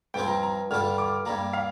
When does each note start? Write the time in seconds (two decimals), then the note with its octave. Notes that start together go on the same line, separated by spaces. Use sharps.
0.14 G2 F3 C4 F4 G5
0.28 A#5
0.43 A#5
0.71 G2 D3 G3 D4 F4 F6
0.98 D6
1.25 G2 G3 A#3 A#5
1.53 F5